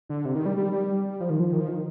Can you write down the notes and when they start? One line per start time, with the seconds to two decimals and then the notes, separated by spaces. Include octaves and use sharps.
0.10 D3
0.25 C3
0.35 D#3
0.46 G3
0.57 G3
0.73 G3
1.20 F3
1.30 D#3
1.40 F3
1.53 D#3
1.61 F3
1.68 D#3